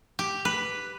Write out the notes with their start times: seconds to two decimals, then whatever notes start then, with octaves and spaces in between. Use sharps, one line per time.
0.19 G4
0.45 B4